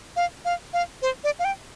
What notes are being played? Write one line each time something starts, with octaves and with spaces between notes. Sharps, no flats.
F5
F5
F5
C5
D5
F5
G5